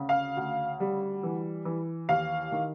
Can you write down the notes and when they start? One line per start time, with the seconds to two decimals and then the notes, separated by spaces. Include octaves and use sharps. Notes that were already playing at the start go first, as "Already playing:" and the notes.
Already playing: D2 C#3
0.09 F5
0.37 D2
0.80 G3
1.23 E3
1.65 E3
2.09 D#2 F5
2.52 D#3